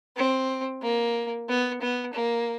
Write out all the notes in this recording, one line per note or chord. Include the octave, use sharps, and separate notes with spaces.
C4
A#3
B3
B3
A#3